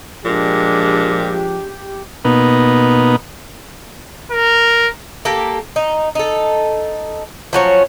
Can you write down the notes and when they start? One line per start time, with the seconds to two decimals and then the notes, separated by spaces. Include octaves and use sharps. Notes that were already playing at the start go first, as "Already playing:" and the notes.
0.25 A#2 F3 G#3 D4 G4
2.25 B2 A#3 B3 D#4
4.31 A#4
5.25 A#3 G4 A4
5.76 D#4
6.15 D#4 A4
7.53 F3 F#3 C#4